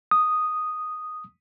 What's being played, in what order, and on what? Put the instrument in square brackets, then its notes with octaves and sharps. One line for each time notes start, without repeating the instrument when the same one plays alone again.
[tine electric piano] D#6